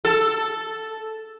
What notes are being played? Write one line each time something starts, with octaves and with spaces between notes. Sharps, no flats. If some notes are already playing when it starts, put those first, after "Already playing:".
A4